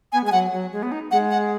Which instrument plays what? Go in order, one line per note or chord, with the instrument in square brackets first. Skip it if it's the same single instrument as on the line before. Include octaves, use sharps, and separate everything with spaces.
[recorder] B3 [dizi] G#5
[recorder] G#3
[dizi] G#5
[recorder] F#3 [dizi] F#5
[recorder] F#3
G#3
B3
D#4
[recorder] G#3 [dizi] F#5
[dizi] F#5